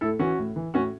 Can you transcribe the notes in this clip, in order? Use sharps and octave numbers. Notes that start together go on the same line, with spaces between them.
A2 E4 A4
E3 C#4 F#4
A2
E3
A2 C#4 F#4